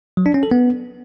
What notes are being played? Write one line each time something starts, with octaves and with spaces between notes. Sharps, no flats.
F#3
D4
C#4
A4
B3